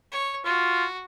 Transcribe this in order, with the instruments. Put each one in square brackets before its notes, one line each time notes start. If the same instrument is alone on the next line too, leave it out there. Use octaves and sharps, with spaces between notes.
[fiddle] C#5
[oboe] F4 [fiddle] F#4